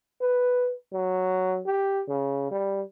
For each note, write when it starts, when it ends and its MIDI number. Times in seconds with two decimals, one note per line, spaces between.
0.21 0.73 71
0.93 1.60 54
1.66 2.03 67
2.08 2.48 49
2.51 2.83 55